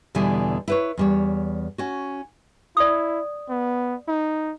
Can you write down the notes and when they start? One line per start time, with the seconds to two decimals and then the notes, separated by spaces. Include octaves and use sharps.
0.15 E2 B2 D3 G3 E4 G#5
0.68 E4 B4 C#5
0.98 E2 G3 C#5
1.78 C#4 F#4
2.77 E4 D5 D#6
3.49 B3
4.08 D#4